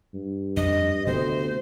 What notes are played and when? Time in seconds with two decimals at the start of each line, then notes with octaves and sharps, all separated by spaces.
0.14 G2
0.57 F2 D4 D#5
1.07 D2 C3 B3 C5